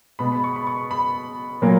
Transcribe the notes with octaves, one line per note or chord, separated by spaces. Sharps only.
B2 G#3 B3 B5
B5
C#6
B5
C#6
B5
A#2 F#3 A#3